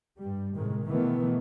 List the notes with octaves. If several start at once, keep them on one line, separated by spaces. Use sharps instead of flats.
G2 G3
A2 C3 D#3 G#3
B2 D#3 E3 A3 B3